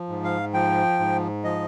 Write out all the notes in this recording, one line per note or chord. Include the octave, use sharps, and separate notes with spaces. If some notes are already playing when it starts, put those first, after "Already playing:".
Already playing: F3
G#2
F5
F3 G5
G#2
F3 D#5